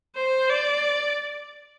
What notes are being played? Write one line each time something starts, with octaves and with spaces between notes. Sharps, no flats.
C5
D5